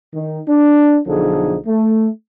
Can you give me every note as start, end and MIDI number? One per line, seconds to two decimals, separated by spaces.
0.14 0.41 51
0.48 0.99 62
1.07 1.57 35
1.07 1.57 50
1.07 1.57 53
1.07 1.57 63
1.07 1.57 68
1.07 1.57 69
1.66 2.08 57